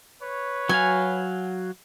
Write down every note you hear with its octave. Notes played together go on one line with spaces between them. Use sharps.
B4 C#5
F#3 F#4 F5 G#5